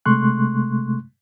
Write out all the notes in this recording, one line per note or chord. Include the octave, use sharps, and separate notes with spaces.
C3 G#3 A3 C6 C#6 F#6